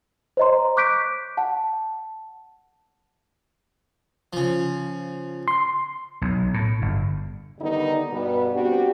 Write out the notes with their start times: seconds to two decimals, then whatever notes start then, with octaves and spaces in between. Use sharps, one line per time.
0.37 C5 C#5 D#5 A#5 C6
0.77 C#6 D6 F#6 G6 B6 D7
1.37 F#5 A5
4.33 C#3 F3
5.48 C6
6.22 B1
6.54 A2
6.82 G1
7.59 D3 D#3 G3 B3 D#4
8.10 G2 B2 G3 B3
8.53 C4 D4 F#4 G4